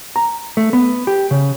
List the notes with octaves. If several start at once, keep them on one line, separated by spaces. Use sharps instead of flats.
A#5
A3
B3
G4
C#3